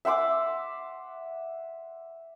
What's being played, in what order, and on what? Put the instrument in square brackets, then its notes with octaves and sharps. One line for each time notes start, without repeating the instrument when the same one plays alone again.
[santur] E5 F#5 C6 D6